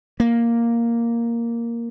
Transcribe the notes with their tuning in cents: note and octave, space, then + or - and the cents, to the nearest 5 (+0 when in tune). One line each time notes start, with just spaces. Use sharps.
A#3 +0